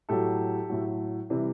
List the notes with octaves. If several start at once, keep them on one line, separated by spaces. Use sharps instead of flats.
A2 F#3 G4 A4
A2 F#3
C3 E3 G3